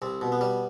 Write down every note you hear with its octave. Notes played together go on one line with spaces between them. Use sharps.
C2 C4
B2
B3
G3